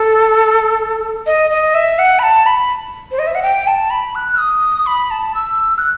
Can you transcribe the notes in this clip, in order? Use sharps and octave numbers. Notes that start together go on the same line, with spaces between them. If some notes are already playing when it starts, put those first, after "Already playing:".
Already playing: A4
D#5
D#5
E5
F#5
B5
A5
B5
C5
D#5
E5
F#5
G5
A5
B5
F#6
D#6
B5
A5
E6
F#6